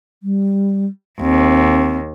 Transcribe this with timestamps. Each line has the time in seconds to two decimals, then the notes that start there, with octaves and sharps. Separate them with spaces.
0.23 G3
1.20 D#2 C4